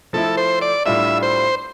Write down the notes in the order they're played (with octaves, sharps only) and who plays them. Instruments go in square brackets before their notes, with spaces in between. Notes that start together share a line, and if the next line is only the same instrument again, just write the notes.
[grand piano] F3 A3 E4 [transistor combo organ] A4
[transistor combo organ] C5
D5
[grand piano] A2 G3 D4 F4 [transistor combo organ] E5
[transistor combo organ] C5